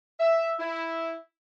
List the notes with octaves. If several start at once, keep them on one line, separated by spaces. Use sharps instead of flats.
E5
E4